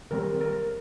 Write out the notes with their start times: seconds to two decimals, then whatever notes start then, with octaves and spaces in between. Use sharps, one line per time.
0.11 D#3 G3 C4 A#4
0.41 A#4